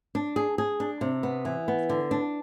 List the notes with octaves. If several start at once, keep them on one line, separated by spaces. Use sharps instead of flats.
D4
G#4
G#4
D4
C3
B3
E3
B3
D3
D4